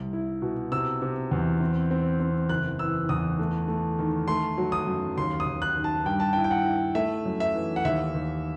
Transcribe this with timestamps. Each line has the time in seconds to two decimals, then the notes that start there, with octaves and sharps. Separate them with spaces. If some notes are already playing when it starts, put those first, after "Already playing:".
Already playing: C2
0.13 E4
0.42 B2
0.72 C3 E6
1.02 C3
1.31 E2
1.61 C4
1.91 C4
2.20 C4
2.49 F#1 F#6
2.79 E3 E6
3.09 E2 D#6
3.39 A3
3.68 A3
3.99 D#3
4.28 A3 C6
4.58 F#3
4.72 D#6
4.87 F#2
5.18 D#2 C6
5.40 D#6
5.46 D#2
5.62 F#6
5.76 D#3
5.84 A5
6.06 G2 G5
6.20 A5
6.33 G5
6.36 E4
6.44 G5
6.51 F#5
6.65 E4
6.95 A3 E5
7.25 F#2
7.40 E5
7.55 E3
7.76 F#5
7.85 D#2 E5
8.14 D#2